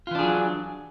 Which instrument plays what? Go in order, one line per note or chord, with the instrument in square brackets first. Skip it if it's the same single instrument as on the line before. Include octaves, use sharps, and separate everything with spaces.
[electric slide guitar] F4
E3
D4
G#4
F#3